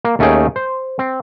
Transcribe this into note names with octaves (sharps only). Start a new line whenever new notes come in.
A#3
D#2 A3 C#4 D#4 G#4 G5
C5
C4